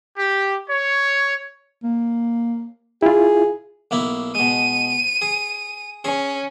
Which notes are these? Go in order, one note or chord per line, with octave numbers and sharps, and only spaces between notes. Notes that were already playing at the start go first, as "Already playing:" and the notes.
G4
C#5
A#3
E4 F4 G#4
B1 A#3 E4
B2 G#3 D#7
G#4
C#4 G#4